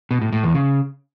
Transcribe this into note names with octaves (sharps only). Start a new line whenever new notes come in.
B2
A2
A2
E2
C#3